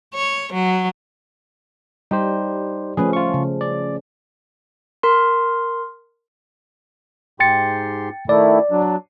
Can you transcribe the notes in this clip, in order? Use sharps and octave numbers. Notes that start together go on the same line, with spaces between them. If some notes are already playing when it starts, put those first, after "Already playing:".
C#5
F#3
G3 D#4 G4 C5
F3 A3 C#4 G#4 B4
F4 C#6
C#3
D5
A#4 C6
G#2 G4 G5 C6 A6 C#7
D#3 A3 E4 D5
F#3 D4